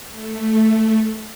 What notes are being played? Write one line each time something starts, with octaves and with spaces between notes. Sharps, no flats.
A3